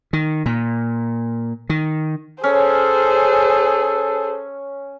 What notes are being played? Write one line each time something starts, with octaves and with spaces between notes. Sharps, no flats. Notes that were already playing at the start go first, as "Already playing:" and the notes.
D#3
A#2
D#3
C#4 G#4 A4 C5